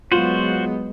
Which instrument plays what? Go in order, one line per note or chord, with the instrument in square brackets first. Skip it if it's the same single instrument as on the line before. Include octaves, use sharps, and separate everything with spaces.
[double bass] F#3 B3 [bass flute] G#3 [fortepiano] F4 [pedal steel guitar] F#4 C5